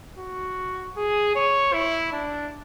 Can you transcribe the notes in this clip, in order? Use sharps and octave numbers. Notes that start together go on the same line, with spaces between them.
F#4
G#4
C#5
E4
D4